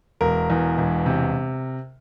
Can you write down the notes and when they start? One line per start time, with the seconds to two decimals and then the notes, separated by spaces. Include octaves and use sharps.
0.21 E1 A#4
0.50 E2
0.78 E1
1.06 C3